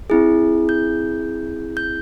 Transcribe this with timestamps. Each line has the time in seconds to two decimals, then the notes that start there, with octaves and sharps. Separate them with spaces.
0.10 C4 E4 G#4
0.69 G6
1.77 G6